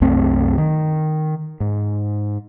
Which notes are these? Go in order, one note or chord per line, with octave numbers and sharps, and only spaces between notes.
C2 F#2 A3 C4
D#3
G#2